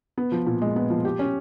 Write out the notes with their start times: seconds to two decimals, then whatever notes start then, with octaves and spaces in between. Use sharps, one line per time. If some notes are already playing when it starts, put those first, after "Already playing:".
0.18 B3
0.32 F3
0.47 A#2
0.62 G#3
0.76 B3
0.90 F3
1.05 G4
1.19 C#4